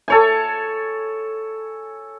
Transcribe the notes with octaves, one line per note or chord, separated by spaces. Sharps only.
A4 C#5 G#5